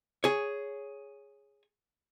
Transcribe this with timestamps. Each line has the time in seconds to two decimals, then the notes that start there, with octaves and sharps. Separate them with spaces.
0.24 G#4 C#5